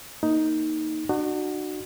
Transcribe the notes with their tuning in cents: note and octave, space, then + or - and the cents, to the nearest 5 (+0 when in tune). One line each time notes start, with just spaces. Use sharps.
A#3 +0 D#4 +5
D4 +45 F#4 +0